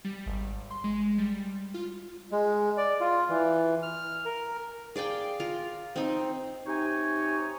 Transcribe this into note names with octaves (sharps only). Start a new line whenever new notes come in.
G3
G#1
C6
G#3
G3
F4
G#3
D5
F4
E3
F6
A#4
G#4 D5 F5 G5
F4 A#4
C4 D#4
C3 D#4 G4 C#5 G#5